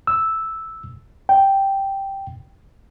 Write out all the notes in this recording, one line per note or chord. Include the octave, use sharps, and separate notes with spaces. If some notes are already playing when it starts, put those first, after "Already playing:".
E6
G5